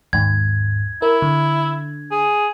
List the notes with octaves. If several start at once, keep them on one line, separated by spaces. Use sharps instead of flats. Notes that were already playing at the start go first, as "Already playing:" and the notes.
D#2 G#2 G#6
E4 A#4
D3
G#4